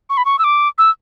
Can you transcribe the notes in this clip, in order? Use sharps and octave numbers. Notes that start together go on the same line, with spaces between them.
C#6
B5
C#6
E6
D6
E6